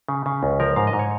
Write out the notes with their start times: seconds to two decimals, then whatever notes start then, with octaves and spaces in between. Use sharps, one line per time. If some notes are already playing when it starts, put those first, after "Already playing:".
0.08 C#3
0.26 C#3
0.43 C#2
0.60 F3 A#4
0.76 G#2 F5
0.87 D#5
0.93 G#2
0.99 C#5